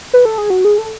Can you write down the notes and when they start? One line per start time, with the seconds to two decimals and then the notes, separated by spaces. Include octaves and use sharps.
0.14 B4
0.25 A4
0.38 G#4
0.50 F#4
0.65 G#4
0.78 A4